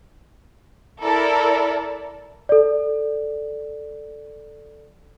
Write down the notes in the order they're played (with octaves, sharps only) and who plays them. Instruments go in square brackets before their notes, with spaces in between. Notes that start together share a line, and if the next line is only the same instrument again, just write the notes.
[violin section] E4 A4 A#4 D5
[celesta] A4 D5